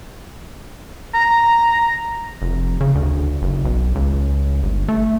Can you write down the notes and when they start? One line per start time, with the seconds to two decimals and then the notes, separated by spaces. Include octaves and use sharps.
1.14 A#5
2.42 F1
2.81 C#3
2.95 D2
3.42 F#1
3.65 B1
3.95 C#2
4.63 G1
4.88 A3